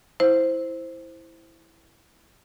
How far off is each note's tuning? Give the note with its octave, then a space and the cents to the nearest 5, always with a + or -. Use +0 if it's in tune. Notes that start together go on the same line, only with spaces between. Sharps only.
E4 +0 C5 +0